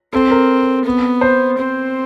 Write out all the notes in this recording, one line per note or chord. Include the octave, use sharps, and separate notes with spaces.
C4 A4
A#4
B3
C5
C4